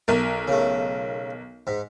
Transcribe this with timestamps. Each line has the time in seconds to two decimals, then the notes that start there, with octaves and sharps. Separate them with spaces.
0.08 B1 A#4 A5
0.48 C#3 A3
1.67 G#2